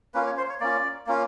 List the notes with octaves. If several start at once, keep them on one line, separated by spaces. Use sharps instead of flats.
A#3 C#4 F4 B4
C#5
C5
C#5
A#3 C#4 F4 D5
A#3 C#4 F4